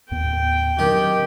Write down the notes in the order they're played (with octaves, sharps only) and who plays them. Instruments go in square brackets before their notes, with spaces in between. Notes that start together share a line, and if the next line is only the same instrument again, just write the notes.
[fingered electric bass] D#2 A2 B3 [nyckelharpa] G5
[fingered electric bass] D3 F#3 C4 [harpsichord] D#3 [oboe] G4